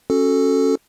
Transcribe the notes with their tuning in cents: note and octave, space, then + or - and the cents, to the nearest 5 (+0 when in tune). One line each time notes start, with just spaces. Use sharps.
C#4 -15 F#4 +0 A4 +0